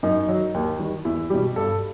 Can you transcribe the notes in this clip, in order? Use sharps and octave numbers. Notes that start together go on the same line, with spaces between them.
F#2 D#4
F#3
D#2
D#3 G3
E2 E4
B2 G3 G4
G2 A4